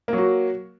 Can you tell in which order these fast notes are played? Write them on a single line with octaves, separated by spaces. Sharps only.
A#3 F#3 F#4